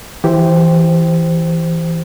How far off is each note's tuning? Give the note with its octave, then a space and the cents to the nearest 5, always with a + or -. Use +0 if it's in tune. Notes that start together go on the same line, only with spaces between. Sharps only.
E3 +0 G4 +0 C5 -5